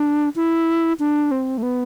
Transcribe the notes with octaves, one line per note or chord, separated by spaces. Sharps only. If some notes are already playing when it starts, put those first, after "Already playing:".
Already playing: D4
E4
D4
C4
A3
B3